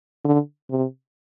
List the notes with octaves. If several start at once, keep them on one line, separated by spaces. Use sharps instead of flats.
D3
C3